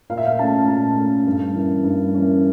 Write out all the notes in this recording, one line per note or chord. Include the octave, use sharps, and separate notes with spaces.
A#2 F5
E5
F5
A3 C#4 A5
A#2 A5
A3 C#4
G2
E3 A#3 C#4
G2
E3 A#3 C#4